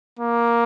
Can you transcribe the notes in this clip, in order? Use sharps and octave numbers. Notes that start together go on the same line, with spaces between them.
A#3